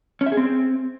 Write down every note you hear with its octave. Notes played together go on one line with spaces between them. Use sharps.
C#4
E5
G#4
C4